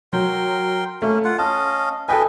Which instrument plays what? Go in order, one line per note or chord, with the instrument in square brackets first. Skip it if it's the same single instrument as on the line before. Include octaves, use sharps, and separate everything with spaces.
[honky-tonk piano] F#3 [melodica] A#4 G5 C6
[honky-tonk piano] A3 [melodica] A#3 C#4
[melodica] F4 F#5
[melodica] C#4 D#5 F5 [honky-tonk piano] A5
[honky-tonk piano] A4 G5 G#5 [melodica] B4 D#5